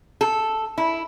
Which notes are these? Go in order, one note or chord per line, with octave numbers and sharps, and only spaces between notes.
A4
E4